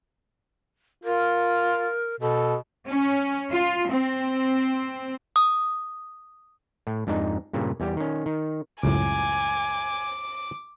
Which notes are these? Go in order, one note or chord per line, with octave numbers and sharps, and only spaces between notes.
F4 A#4
B2 A4
C#4
F4
C4
D#6
A2
F2 G#2 D4 D#4
G2 A#2 C#3
E2 G3 G4
D#3 C#4
D#3
C#2 F#2 A2 G#5 D6